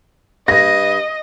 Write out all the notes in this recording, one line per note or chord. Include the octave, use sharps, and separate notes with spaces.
G2 D#5 A#6